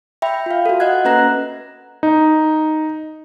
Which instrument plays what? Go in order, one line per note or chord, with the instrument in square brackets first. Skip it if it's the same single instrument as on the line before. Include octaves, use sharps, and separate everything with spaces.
[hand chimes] E5 G5 B5
F4 F5
F#4 A4
D#5 F#5 F#6 G#6
A#3 C#4 B4 A#5 F#6 A#6
[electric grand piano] D#4